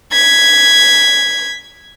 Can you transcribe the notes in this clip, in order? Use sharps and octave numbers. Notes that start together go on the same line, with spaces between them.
G#6 B6